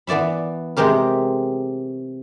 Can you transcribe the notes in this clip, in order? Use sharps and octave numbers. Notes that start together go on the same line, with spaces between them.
E3 B3 D5 E5 B5
C3 G#3 C4 G4 A#4